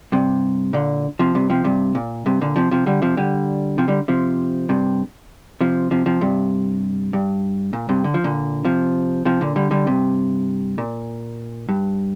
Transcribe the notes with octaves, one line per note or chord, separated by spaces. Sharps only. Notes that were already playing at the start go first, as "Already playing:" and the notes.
G2 C3
A#2 D3
C3 F3
G2 C3
C3 F3
G2 C3
A#2
G2 C3
A#2 D3
C3 F3
C3 F3
D3 G3
C3 F3
D3 G3
C3 F3
D3 G3
C3 F3
G2 C3
C3 F3
C3 F3
C3 F3
G2 C3
G2
A#2
G2 C3
D3
F3
A#2 D3
C3 F3
C3 F3
A#2 D3
D3 G3
D3 G3
G2 C3
A#2
G2